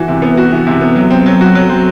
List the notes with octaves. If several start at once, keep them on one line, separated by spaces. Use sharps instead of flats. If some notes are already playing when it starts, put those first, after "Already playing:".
Already playing: E3 F#4
C3
B3
F#4
E3
C3
B3
F#3
C4
F#3
F#4
F#3
C4